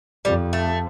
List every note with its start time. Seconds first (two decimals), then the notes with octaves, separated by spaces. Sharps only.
0.25 F2 G3
0.53 A3